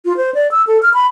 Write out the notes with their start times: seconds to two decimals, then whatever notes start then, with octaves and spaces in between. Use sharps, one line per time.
0.05 F4
0.17 C5
0.34 D5
0.51 E6
0.67 A4
0.83 F6
0.94 B5